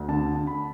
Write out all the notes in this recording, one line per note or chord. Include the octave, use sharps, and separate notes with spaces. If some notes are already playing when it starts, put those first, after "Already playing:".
Already playing: D2
D3 A5
D3
B5